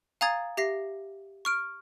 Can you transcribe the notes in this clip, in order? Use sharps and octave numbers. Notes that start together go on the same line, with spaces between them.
F5 G#5 A#5 D#6 G#6 A6
G4 E5 A#6 C7
C#6 F6 D7